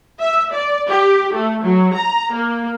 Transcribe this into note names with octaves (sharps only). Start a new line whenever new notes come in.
E5
D5
G4
A3
F#3
A#5
A#3